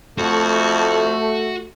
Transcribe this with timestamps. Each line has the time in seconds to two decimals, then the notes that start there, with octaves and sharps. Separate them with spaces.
0.18 F2 A3 F#4